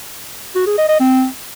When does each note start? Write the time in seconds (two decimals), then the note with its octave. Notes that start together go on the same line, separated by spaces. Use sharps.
0.56 F#4
0.67 G#4
0.78 D#5
0.89 D#5
1.00 C4